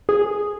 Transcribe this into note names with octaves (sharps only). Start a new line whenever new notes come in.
G#4